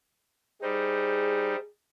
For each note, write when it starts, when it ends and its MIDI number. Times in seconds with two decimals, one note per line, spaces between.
0.62 1.56 55
0.62 1.56 63
0.62 1.68 68
0.62 1.59 72